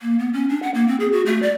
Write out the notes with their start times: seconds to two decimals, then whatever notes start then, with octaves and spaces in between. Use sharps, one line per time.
0.02 A#3
0.19 B3
0.34 C#4
0.49 D4
0.63 F#5
0.74 A#3
0.88 C4
1.00 G#4
1.12 F#4
1.26 A3
1.43 D5